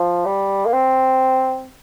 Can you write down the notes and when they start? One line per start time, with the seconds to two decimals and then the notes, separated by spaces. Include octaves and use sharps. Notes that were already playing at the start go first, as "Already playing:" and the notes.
Already playing: F3
0.25 G3
0.66 A#3
0.73 C4